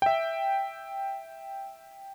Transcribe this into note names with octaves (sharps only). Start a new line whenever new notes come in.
E5 G5